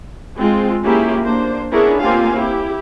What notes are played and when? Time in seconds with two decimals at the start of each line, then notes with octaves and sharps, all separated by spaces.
0.39 G#3 C4 F4
0.85 A#3 C#4 E4 F4 G4 G#4
1.23 A#3 D4 C5
1.72 B3 C#4 D4 E4 G#4 A#4
2.01 A#3 C4 F4 G4 F5 G#5
2.35 E4 G4